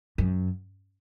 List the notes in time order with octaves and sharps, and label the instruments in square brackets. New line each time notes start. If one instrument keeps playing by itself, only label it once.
[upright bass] F#2